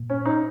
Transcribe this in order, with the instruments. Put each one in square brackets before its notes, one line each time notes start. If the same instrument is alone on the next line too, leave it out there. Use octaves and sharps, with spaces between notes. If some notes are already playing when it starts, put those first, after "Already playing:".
Already playing: [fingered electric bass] A#2 A#3
[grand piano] C#4
D#4